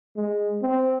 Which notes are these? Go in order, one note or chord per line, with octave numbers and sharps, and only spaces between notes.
G#3
C4